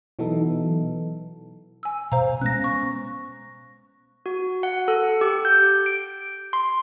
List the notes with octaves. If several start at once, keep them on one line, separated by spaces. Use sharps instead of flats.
B2 E3 F#3 B3 D#4 A4
G#5 E6
B2 C5 F5 A#5
G#3 B3 C#4 F#6 A#6
C#6
F#4
F#5
A4
G4
G6
D7
C6